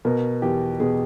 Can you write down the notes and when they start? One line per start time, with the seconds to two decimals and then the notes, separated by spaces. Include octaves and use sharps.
0.05 B2 A#4
0.42 E2 G4
0.80 B2 G#4